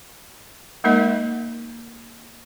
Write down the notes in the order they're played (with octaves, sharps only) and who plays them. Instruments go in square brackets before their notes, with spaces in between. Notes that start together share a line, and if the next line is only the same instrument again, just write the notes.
[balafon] G#3 A#3 D#4 A#4 D#5